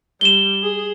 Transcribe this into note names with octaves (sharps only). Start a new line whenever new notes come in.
G3 E7 G7
G#4